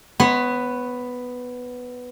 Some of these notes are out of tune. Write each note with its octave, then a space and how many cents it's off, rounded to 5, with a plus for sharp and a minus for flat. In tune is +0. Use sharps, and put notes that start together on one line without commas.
B3 +5 C#5 -25